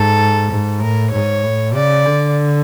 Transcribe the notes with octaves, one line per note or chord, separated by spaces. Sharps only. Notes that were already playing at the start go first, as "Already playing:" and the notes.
Already playing: G#2 A4
G#2
A2 A#4
G#2 C#5
A2
C#3 D5
D3